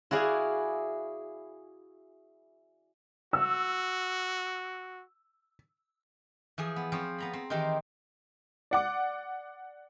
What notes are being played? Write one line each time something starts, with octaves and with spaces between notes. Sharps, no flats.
E4 F#4 G#4 D5 F5
F#4 E6
E3 F3 G#4
B3
F3 C4 C#5
B3 A#5 B5
C4
D#3 E3 D#4 G4 A#4 C5
D5 F#5 D6